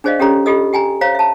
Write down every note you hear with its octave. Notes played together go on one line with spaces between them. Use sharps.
D4 G#4 C5 D5 D#5 F5
C#4 G4 A4 C#5 A#5
F4 G4 A4 D#5 E6
G4 G5 G#5 A#5
C5 C#5 F5 A#5
E5 A5